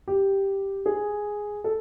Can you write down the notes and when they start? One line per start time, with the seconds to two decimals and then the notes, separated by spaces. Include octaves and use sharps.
0.08 G4
0.86 G#4
1.64 A4